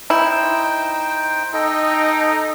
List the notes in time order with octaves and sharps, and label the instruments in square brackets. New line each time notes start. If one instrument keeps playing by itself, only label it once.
[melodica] D#4 C5 G5 [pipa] E4
[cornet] D#4 [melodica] A4 D#5 G5